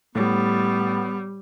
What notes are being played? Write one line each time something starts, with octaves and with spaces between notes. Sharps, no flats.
A2 G3 B3